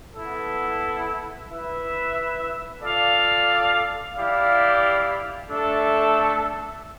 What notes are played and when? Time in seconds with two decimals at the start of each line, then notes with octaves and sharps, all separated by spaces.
0.15 B3 E4 A4
1.49 E4 B4 E5
2.82 F4 A4 D5 F5
4.14 E4 G4 D5 F5
5.48 A3 D4 A4 E5